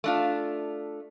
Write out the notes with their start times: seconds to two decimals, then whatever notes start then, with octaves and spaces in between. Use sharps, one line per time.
0.04 A3 D4 F4